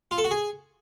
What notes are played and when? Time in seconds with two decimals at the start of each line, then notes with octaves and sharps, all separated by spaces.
0.11 F4
0.18 A4
0.24 F#4
0.31 G#4